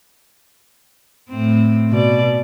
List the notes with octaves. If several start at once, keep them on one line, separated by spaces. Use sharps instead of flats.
A2 C4
B2 D5